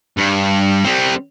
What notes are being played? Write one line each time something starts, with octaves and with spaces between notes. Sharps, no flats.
G2
G3 C4